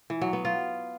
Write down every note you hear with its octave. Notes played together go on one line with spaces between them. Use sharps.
E3
F#3
B3
F4